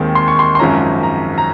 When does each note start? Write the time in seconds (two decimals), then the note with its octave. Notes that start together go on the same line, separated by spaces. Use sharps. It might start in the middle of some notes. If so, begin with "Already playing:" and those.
Already playing: D#2 D#3 G#3 C4
0.15 C6
0.28 C#6
0.39 C6
0.55 C6
0.59 G#1 F#2 F3 G#3 C#4 A#5
1.03 A#5
1.38 A#5